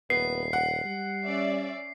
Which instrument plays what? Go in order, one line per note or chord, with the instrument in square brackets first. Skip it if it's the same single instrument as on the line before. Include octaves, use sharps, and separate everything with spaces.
[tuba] D#1 [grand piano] B3 [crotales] C7
[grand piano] F#5
[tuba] G3
[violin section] C#4 D5 E5